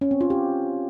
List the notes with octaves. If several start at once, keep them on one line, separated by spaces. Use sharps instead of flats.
C#4
C4
F4
G4